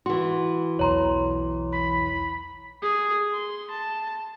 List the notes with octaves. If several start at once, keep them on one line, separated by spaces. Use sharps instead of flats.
E3 F#4 C6
B1 E2 C#5 A#5 C6
B5
G#4
C6
A5